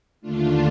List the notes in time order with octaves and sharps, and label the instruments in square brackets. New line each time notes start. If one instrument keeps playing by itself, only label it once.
[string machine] D#2 D3 A3 D4 F4